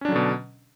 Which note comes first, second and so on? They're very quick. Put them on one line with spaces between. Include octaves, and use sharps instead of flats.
C#4 D4 F#3 D3 B2